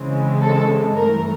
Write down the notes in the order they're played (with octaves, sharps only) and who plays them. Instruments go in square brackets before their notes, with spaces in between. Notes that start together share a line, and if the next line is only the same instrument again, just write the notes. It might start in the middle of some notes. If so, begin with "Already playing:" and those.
Already playing: [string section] C#3 E3 G#3 C4
A4
G2 E3 A3 A#4